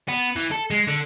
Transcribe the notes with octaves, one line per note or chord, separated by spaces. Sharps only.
B3
E3
A4
G#3
D3